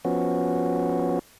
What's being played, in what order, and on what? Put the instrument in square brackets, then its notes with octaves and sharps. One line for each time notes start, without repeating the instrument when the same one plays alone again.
[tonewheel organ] F3 B3 C#4 F#4